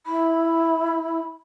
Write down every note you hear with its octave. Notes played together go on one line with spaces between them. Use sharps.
E4 B5